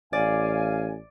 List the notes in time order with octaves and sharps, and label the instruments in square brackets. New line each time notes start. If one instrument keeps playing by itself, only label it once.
[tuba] A1 [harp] D5 [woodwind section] F5 G#5